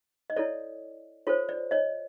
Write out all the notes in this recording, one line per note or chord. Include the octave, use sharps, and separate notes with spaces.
D#5
E4 A4 C#5 D5
F4 A4 C5 C#5
D5
C#5 D#5